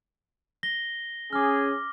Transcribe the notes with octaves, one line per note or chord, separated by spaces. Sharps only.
A#6 G7
C#4 G#4 D6 F6